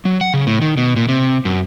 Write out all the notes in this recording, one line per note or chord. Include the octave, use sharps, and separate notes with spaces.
F#3
F#5
C#3
A2
D#3
B2
A#2
C3
F#2